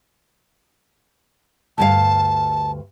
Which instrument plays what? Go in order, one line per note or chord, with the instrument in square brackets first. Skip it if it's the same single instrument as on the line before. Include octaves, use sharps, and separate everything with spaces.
[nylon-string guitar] D2 G2 F5 [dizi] A5